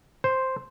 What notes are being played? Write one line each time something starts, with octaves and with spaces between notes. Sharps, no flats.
C5